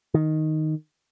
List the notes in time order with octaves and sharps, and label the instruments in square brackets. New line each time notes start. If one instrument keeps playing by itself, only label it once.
[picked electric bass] D#3